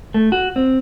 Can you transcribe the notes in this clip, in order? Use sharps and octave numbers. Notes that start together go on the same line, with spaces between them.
A3
F#4
C4